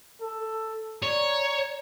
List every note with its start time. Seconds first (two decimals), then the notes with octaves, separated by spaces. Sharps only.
0.21 A4
1.03 C#5 D5 A#5